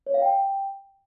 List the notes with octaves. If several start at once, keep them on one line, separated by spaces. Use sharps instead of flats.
C#5
F5
G5